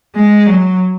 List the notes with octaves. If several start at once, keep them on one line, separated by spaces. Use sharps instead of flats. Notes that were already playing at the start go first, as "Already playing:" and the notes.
G#3
F#3